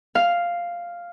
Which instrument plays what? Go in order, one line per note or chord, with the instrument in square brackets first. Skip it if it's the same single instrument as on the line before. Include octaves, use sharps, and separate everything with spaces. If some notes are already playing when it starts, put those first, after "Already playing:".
[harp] F5